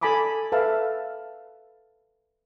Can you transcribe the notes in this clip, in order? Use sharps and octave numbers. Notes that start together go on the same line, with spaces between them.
A4 G#5 A5 B5 D6 D#6
A4 B4 E5 F5 A5